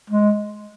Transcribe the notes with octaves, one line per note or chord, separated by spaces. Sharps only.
G#3